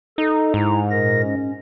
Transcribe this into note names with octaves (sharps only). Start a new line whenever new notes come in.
D#4 A4
G#2 E4 A#5
A#2 A#4 A#6
C#4